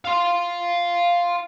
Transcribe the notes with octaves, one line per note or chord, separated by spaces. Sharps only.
F5 C6